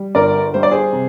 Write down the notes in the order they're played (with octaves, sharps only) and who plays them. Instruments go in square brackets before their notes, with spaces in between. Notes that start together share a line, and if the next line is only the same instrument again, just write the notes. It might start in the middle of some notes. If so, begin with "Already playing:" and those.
Already playing: [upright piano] G3
G1 A#4 D5
G3 C5
D5
G#4 C5
C3